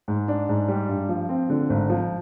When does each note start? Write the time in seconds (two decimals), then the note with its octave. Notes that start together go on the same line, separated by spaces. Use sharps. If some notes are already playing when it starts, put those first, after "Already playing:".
0.08 G#2
0.28 D4
0.49 G#2
0.68 G3
0.89 G2
1.09 F3
1.29 C4
1.50 D3
1.70 G#1
1.90 F3